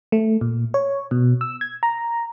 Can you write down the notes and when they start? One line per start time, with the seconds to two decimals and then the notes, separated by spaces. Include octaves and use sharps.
0.12 A3
0.41 A#2
0.74 C#5
1.11 B2
1.41 E6
1.61 G#6
1.83 A#5